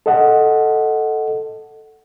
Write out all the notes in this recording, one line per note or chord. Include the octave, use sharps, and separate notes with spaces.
A4 D#5 F#5